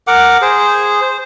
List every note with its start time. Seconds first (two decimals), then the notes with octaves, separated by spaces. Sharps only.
0.07 A#4 F#5 D6
0.42 G#4 C5
1.01 C5